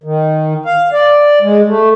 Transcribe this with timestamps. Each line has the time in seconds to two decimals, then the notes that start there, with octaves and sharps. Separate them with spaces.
0.04 D#3
0.66 F5
0.93 D5
1.42 G#3
1.67 A3